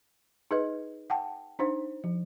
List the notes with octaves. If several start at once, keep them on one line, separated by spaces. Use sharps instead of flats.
D#4 G#4 B4 D#5
F#5 G5 A5
D4 D#4 C5
F3